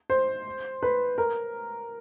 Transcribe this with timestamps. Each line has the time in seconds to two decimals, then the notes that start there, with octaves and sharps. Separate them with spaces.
0.10 C5
0.83 B4
1.18 A#4